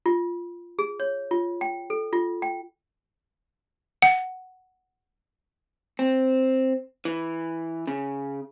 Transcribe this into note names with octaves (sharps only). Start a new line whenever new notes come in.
F4
G#4
C#5
F4
G5
A4
F4
G5
F#5
C4
E3
C#3